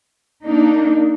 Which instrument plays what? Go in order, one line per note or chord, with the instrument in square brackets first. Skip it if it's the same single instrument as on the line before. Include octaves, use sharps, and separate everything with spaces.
[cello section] A#3 D4 D#4